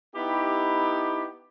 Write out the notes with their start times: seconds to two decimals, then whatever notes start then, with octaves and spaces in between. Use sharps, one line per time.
0.15 B3 D#4 E4 G4